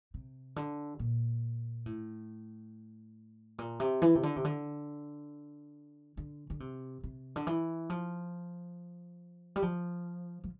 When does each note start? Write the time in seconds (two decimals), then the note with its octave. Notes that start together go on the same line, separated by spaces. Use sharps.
0.14 C3
0.56 D3
0.99 A#2
1.86 A2
3.58 A#2
3.80 C3
4.02 E3
4.15 C3
4.23 D3
4.36 C3
4.45 D3
6.17 D3
6.50 D3
6.60 C3
7.03 C3
7.36 D3
7.47 E3
7.90 F3
9.56 G3
9.62 F3
10.44 F3